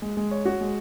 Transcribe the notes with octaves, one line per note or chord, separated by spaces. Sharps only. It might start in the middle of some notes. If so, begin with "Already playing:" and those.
G#3
G#3
C#5
F#4
G#3